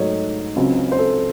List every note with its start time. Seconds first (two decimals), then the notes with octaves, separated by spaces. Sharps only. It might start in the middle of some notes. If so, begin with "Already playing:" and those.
Already playing: G#2 F#3 A3 C#5 D#5
0.56 C#2 C#3 F#3 C4
0.92 C5
0.99 A4